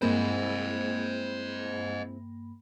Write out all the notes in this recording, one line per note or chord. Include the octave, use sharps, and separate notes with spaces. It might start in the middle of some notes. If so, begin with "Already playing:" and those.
G2 G#3 A#3 C4 E4 C5 D#5 B5